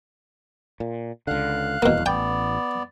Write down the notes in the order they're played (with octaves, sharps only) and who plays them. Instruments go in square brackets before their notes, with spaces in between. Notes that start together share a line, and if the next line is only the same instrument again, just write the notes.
[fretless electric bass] A#2
[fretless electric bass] C#2 D3 [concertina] F5 F#6
[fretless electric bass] D#1 E2 [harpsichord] B2 A#3
[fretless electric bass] A1 [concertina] B3 D5 [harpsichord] G5